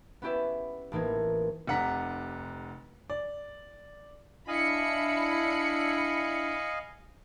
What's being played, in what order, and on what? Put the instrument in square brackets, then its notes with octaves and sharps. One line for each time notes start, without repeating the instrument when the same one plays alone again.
[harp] B3 C#4 E4 G4 D5 E5
A1 E3 A#3 D#4 G#6
[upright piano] F1 C3 F#5 A#5 B6
D5
[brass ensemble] D4 E4 [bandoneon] D#5 F5 G#5 [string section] B5 C#7